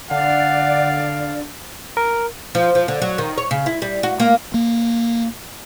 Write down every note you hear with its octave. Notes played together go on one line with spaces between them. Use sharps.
D3 D5 F5 F#5
A#4
F3
F3
D3
F#3
D#3
C#5
C#3
E4
G3
F#4
A#3
A#3